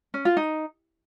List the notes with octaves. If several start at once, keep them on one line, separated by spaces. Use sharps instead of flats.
C#4
F4
D#4